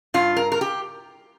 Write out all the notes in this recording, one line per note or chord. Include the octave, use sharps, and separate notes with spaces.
G2 F4
A#4
A#4
G4